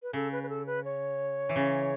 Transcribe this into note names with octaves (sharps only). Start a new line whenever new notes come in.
B4
C#3 A4
B4
B4
A4
B4
C#5
E3
C#3